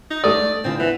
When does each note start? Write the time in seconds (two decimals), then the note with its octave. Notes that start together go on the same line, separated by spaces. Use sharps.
0.10 D#4
0.24 A3 D5 D#6
0.64 D3 E3 C4 F4
0.80 E3 B3